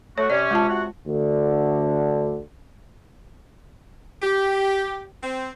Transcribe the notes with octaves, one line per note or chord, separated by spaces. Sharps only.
A3 F#4 C#5
C3 C#4 D5
G#3 F4 A5
C3 F#4 F#5
D2 D3
G4
C4